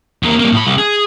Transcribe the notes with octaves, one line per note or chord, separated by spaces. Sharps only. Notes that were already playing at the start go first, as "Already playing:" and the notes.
E2 A#3
G3 A#3
A2 B5
C2
G#4